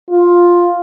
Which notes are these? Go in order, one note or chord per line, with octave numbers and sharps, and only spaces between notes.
F4